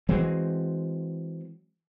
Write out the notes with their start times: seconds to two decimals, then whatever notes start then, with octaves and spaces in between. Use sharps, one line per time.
0.09 E3 F#3 G#3 C4